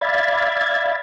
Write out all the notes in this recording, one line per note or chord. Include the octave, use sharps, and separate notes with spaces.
D5 E5 F5 B5 G#6 A6